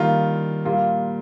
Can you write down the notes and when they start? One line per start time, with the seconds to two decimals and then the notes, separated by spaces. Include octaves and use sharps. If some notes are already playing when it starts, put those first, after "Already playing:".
Already playing: D#3 G3 A#3 F4
0.65 A#2 G3 A#3 F4